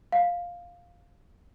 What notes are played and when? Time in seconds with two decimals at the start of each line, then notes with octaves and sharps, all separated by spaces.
0.12 F5